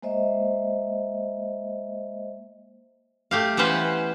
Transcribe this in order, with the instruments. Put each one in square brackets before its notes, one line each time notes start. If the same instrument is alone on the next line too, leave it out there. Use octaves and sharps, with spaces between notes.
[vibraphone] G#3 A#3 C5 D#5 E5
[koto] A3 G4 F5
E3 B3 C#4 B4 C5